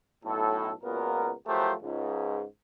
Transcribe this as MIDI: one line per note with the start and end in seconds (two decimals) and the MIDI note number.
0.25 0.71 35
0.25 0.71 45
0.25 0.71 69
0.83 1.31 37
0.83 1.31 46
0.83 1.31 59
0.83 1.31 66
0.83 1.31 70
1.47 1.73 53
1.47 1.73 54
1.47 1.73 57
1.47 1.73 67
1.47 1.73 70
1.47 1.73 72
1.82 2.44 37
1.82 2.44 44